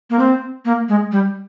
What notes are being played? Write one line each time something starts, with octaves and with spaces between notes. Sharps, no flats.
A#3
C4
A#3
G#3
G3